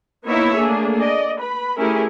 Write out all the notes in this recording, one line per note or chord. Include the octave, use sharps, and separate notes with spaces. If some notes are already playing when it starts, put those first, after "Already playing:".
A#3 B3 D#4 E4 C#5 E5
A3 A#3 D4 G#4
D5 D#5
B4 B5
A3 C#4 E4 G4 G#4 A#4